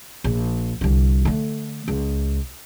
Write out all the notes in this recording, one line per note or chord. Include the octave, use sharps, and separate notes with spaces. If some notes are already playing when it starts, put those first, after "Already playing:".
A#1
C2 D3
D3 A3
C#2